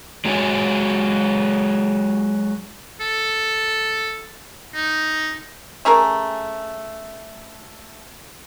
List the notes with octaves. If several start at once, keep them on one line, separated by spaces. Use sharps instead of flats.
F#3 G#3 F#4 C#5 G#5
A4
D#4
A3 C#4 G#4 A#4